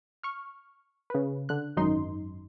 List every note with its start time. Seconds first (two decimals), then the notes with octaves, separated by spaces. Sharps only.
0.23 C#6 F6
1.10 C#3 B4
1.49 D3 F#6
1.77 G#1 F#2 D#4 C6